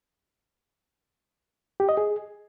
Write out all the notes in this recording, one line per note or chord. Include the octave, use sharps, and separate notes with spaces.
G4
D#5
G#4